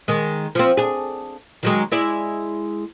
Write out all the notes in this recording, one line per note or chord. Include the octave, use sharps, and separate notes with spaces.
D#3 G#3
F3 C4
D4 G#4
D#3 F#3 G#3
G#3 E4 D5